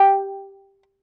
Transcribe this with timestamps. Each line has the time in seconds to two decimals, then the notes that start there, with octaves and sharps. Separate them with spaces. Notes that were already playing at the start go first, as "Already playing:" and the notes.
Already playing: G4